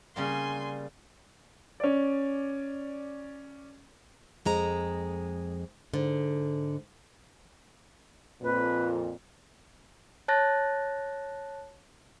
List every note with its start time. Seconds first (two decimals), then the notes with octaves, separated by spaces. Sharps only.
0.16 C#3 G3 A#3 G#5 C6
1.80 C#4 D5
4.45 F2 G#3 A#5
5.94 G#2 D3
8.42 F2 A#2 B4
10.28 C#5 A5 F#6 A6 A#6